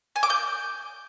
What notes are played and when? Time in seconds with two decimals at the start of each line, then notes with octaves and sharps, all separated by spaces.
0.16 G#5
0.23 D6
0.30 G6